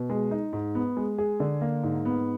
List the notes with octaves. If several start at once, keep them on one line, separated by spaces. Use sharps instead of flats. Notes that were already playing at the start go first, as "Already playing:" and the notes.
Already playing: B2
G#3
D#4
G#2
B3
G#3
G#4
D3
A#3
G#2
B3